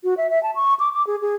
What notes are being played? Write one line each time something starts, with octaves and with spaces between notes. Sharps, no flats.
F#4
E5
E5
A5
C#6
D6
D6
G#4
G#4